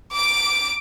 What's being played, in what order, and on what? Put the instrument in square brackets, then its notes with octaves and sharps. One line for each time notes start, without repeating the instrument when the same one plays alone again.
[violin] D6 D7